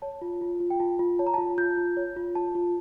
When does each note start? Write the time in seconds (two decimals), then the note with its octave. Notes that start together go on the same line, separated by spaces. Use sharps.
0.02 C#5 A5
0.21 F4
0.41 F4
0.60 F4
0.70 G5
0.80 F4 A5
0.99 F4
1.19 C#5 A5
1.27 A#5
1.34 F4 A5
1.58 F4 G6
1.77 F4
1.97 C#5
2.16 F4
2.35 F4 A5
2.55 F4